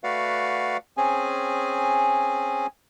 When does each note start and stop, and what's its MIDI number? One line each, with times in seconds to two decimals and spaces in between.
0.04 0.77 57
0.04 0.77 66
0.04 0.77 71
0.04 0.77 74
0.04 0.77 77
0.04 0.77 78
0.97 2.67 60
0.97 2.67 61
0.97 2.67 68
0.97 2.67 80